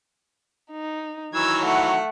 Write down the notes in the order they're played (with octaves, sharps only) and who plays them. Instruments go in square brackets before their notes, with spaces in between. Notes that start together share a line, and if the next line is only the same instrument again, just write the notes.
[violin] D#4
[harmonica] D#3 E3 F#3 [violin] E6 G#6
[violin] A3 F#5